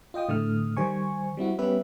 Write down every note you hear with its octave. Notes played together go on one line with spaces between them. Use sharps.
F4 D#5 G5 D#6
A2 D3 A3 D#6 F6
D#3 G3 C5 G#5 C#6
G3 C4 E4 F#4
G3 B3 C#4 G4 B4 E5